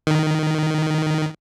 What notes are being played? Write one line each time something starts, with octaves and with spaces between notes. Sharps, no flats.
D#3